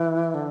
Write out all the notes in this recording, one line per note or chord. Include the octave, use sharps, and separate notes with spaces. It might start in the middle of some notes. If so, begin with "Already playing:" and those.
Already playing: E3
D3